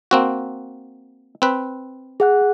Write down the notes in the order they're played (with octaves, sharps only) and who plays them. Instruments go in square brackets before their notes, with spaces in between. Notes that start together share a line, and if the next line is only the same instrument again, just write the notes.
[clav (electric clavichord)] A#3 C4 F#4
C4 B4
[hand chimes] G#4 F#5 F#6